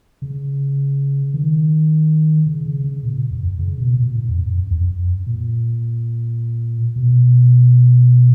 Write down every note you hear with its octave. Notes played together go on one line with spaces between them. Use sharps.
C#3
D#3
C#3
C#3
C#3
A#2
F#2
F#2
C#3
B2
A#2
G#2
F2
F#2
F#2
F2
F#2
A#2
B2